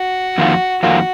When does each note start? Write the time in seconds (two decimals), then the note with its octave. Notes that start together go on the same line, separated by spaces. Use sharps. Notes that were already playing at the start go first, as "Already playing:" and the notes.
Already playing: F#4
0.38 F2 D#3 A#3 F4
0.82 F2 D#3 A#3 F4 F#4